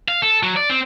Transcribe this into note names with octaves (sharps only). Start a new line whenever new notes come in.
F5
A4
F#3
D5
C4